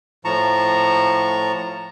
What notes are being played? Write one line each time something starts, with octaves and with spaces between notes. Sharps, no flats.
A2 F3 A5 A#5 C#6